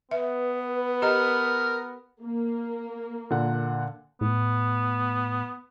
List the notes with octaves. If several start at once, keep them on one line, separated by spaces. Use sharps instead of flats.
B3 B4 E5
G4 A#4 D#5 A#5
A#3
A#2 D3 F#5
A2 B3